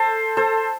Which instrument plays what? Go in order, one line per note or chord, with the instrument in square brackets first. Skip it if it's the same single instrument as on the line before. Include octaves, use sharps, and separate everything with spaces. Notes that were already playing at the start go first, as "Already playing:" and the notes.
Already playing: [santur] A4 C5
A4 C5